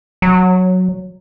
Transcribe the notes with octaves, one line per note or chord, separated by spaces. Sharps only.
F#3